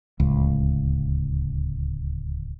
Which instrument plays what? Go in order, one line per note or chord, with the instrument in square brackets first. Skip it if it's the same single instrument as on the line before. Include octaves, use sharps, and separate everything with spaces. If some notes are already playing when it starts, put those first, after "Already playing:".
[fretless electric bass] D1 C#2